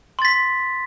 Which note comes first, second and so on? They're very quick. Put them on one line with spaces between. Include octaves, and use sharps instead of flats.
C6 A6 B6